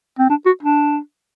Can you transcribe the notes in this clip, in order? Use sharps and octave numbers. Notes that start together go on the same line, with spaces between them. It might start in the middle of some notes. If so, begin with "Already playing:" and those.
C4
D4
F#4
D4